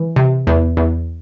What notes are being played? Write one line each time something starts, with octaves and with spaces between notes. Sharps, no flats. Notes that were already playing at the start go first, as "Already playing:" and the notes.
Already playing: E3
C3
E2
E2